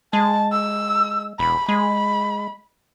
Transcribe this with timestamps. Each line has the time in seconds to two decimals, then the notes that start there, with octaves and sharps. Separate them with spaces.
0.13 G#3 A5
0.52 E6
1.40 E1 B5
1.69 G#3 B5